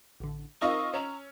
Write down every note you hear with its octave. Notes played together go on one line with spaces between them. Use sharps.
A1 D3
C4 D#4 F4 A#4 D#5 C#6 E6
C#4 A#5